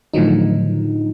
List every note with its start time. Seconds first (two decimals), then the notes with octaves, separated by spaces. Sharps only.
0.13 A2 D3 D#3 F3 F#3 D#4